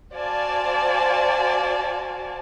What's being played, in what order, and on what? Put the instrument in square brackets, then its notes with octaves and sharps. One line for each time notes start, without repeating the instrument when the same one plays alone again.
[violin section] F#4 C5 D5 F5 G#5 A5